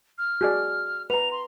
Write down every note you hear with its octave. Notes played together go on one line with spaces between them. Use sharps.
F6
F#4 G#4 D5
B4 A#5 F7
C6